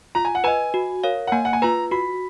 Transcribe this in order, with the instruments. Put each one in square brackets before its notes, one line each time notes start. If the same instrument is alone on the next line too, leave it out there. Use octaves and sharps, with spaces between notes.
[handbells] F4 [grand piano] A#5
[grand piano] G#5
F#5
[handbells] B4 D#5 [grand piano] G#5
[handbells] F#4
A#4 C#5 F5
[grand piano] F#5
[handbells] A#3 [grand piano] G#5
[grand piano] F#5
G#5
[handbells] F4 B4 [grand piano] A#5
[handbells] F#4 [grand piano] B5